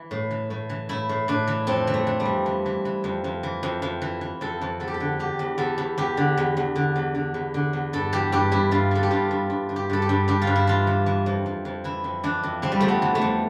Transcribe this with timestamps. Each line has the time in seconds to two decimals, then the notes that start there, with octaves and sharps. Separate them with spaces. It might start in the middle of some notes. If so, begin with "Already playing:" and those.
Already playing: E3
0.11 A2
0.31 E3
0.50 A2
0.69 E3
0.89 A2 E4
1.09 A2
1.28 A2 D4
1.47 E3
1.67 F2 C4
1.87 E3
1.94 A3
2.07 E3
2.20 G3
2.26 F2
2.46 E3
2.66 E3
2.85 E3
3.04 F2
3.24 F2
3.43 E3
3.63 F2
3.82 F2
4.02 E3
4.21 E3
4.41 F2 A4
4.61 F2
4.80 E2 A4
4.88 G4
4.94 A4
5.00 D3
5.19 E2 G4
5.39 E2
5.58 E2 A4
5.78 E2
5.98 E2 G4
6.17 D3
6.37 E2
6.57 E2
6.76 D3
6.96 E2
7.15 D3
7.34 E2
7.54 D3
7.73 E2
7.93 G2 A4
8.13 E3 G4
8.32 G2 G4
8.52 G2 E4
8.71 G2 F4
8.91 E3 A4
9.03 G4
9.11 G2 F4
9.31 G2
9.50 G2
9.69 G2
9.76 G4
9.90 G2 A4
10.02 G4
10.09 G2
10.28 G2 G4
10.42 F4
10.47 G2
10.56 E4
10.67 E3 F4
10.87 E3
11.06 E3
11.26 F2
11.46 F2
11.65 F2
11.84 E3 E4
12.04 F2
12.23 E3 D4
12.43 F2
12.62 E3 C4
12.72 G3
12.80 F2 A3
12.88 B3
13.02 E3
13.15 A3
13.22 F2